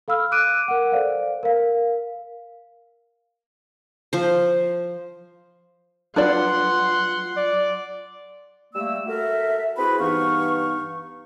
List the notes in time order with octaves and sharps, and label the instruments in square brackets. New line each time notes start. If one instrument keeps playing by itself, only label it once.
[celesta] A4 F5 B5 E6 F6
D6 F#6 D7 D#7
A#4 F#5
A4 C5 D5 F5
A#4 F5
[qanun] F3 C5
[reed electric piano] F#3 F4 [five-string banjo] D4 B4 D5 [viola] F#5 C6
[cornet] D5
[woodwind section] G3 A3 A#3 E6
F#4 A4 A#4 E5
C4 E4 F#4 G#4 B4 B5
G2 E3 B3 D#4 F5 C#6